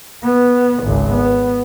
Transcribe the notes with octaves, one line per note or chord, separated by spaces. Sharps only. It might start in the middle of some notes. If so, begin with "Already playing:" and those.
B3
G#1 C#2
B3